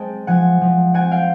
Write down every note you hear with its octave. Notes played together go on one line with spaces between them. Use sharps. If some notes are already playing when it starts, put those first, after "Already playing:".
Already playing: G#3 C4 G5 A5
F3 F#5 G#5
F3
C4 F#5 G#5
F5 G5